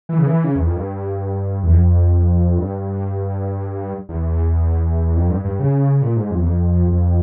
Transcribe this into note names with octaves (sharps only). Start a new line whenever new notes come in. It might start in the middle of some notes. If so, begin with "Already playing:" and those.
E3
C#3
E3
C#3
E2
F2
G2
E2
F2
G2
E2
F2
G2
G2
C#3
A#2
G#2
F2
E2
F2
F2